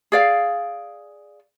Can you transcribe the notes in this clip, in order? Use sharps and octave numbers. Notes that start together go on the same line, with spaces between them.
G#4 D5 F5